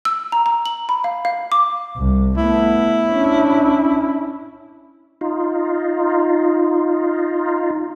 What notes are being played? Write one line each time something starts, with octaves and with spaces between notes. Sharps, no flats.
E6
A#5
A#5
F#7
B5
F5
F5
D6
C2
A3 B3 E4
C#4 D4
D#4 F4